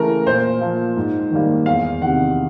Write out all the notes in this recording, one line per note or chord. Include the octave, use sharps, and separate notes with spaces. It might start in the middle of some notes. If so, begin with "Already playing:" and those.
Already playing: C#3 E3 A3 A#4
A#2 C5
F3 A#3
G#2
D#3 G3 A#3
E2 F5
C3 D#3 F#5